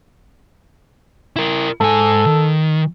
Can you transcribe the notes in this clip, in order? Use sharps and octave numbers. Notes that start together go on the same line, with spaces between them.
E4 A#4
G#2 A4 G#5
D#3